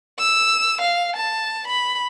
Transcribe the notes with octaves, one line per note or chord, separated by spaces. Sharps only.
E6
F5
A5
B5